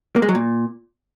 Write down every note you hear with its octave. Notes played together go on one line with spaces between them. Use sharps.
A#3
G#3
F#3
A#2